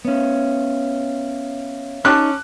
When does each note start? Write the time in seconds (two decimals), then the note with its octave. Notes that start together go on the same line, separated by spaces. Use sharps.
0.05 B3 C#4 C#5 E5 F5
2.05 C#4 D#4 A5 D6 F#6